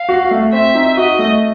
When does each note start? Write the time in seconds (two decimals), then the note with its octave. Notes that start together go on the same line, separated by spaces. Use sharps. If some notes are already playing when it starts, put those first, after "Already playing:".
Already playing: F5
0.09 F#4
0.31 A3
0.53 C4 E5
0.75 D#4
0.96 F#4 D#5
1.19 A3